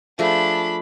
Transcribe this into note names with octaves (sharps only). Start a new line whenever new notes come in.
F3 A3 D4 G#4 B5